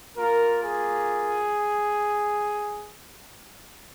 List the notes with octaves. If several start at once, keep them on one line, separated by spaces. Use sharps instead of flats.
A#3 F4 A#4
G#4